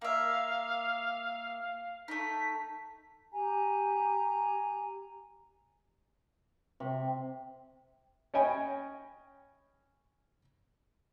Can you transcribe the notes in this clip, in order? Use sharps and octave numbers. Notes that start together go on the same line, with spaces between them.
A#3 E5 F5
A3 D#4 B6
G4 G#5 A#5
C3
C#4 C#5 D#5 G5 G#5 B5